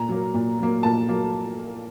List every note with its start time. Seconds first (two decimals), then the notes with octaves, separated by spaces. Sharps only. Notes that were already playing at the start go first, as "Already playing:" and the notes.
Already playing: A#2 A#5
0.09 F#3 A#3
0.34 A#2
0.59 F#3 A#3
0.83 A#2 A5
1.09 F#3 A#3